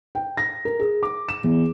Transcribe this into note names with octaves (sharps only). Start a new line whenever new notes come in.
G5
A#6
A#4
G#4
D6
E7
E2